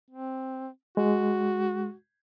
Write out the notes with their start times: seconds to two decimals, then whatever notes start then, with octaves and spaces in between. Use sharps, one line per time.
0.11 C4
0.97 G#3 F#4